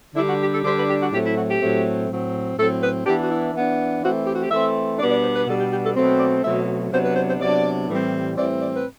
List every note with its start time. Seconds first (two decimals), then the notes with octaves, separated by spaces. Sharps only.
0.15 D3 G3 D4 E4
0.27 F#4
0.40 G4
0.52 A4
0.64 D3 G3 D4 C5
0.76 B4
0.88 G4
1.00 F#4
1.12 A2 F#3 A3 C4 G4
1.24 E4
1.36 F#4
1.48 G4
1.60 A2 F#3 A3 C4
2.09 A2 F#3 C4
2.57 A2 F#3 C4 A4
2.81 B4
3.05 E3 B3 D4 G4
3.21 F#4
3.29 E4
3.53 E3 B3 D4
4.01 E3 A3 C4 F#4
4.26 G4
4.34 F#4
4.41 G4
4.50 E3 A3 C4 E5
4.98 B2 G3 B3 D4 D5
5.10 D5
5.22 C5
5.34 B4
5.47 B2 G3 B3 D4 A4
5.58 G4
5.71 G4
5.83 A4
5.95 B2 F#3 A3 C4
6.19 D5
6.43 B2 F#3 A3 C4 E5
6.91 C3 F#3 B3 D4 C5
7.03 B4
7.15 C5
7.28 C5
7.39 C3 F#3 B3 D4 D5
7.88 A2 E3 G3 C4
8.36 A2 E3 G3 C4 D5
8.60 D5
8.74 B4